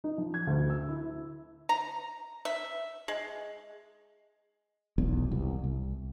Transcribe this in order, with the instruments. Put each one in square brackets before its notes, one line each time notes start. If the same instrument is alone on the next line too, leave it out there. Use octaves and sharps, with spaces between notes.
[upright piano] D#4
F3
G#6
D2
E6
E4
[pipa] A#5
E5
G#3
[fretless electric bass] F1 B1 E2 G#2
C2
C2